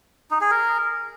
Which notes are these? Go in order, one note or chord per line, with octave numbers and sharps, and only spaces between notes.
D#4
G#4
A#4